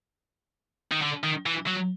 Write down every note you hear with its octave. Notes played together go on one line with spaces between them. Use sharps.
D#3
D3
D#3
E3
F#3